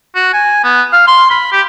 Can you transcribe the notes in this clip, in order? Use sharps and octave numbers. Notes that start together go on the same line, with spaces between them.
F#4
G#5
B3
F5
C6
B5
G4